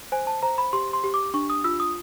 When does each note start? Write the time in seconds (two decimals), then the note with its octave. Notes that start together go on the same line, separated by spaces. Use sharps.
0.12 C5 G#5
0.27 A5
0.43 C5 A#5
0.58 B5
0.73 G4 C6
0.93 C6
1.04 G4
1.14 D6
1.34 D4 C#6
1.50 D#6
1.64 F4 E6
1.80 D#6